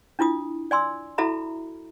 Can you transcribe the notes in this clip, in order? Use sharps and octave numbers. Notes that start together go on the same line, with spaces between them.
D4 E4 F4 D#6
D5 G#5 C6 E6
E4 F#4 A4 E5 A#5 B5